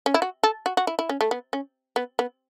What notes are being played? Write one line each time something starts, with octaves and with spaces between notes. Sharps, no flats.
C#4
E4
F#4
A4
F#4
F#4
E4
E4
C#4
A3
B3
C#4
B3
B3